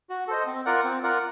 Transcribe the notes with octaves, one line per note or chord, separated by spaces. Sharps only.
F#4
A4 C5 D#5
C4
F4 A#4 D5 F#5
C4
F4 A#4 D5 F#5